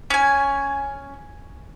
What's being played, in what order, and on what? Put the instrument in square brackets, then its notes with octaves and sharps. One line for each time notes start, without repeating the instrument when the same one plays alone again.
[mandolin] C#4 G#5